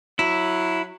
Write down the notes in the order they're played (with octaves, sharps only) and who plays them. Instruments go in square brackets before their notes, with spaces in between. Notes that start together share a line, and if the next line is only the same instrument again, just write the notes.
[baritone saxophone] F#3 [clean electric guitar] E4